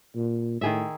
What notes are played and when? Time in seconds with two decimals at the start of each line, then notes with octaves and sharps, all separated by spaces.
0.16 A#2
0.61 A2 D#3 G#4 E5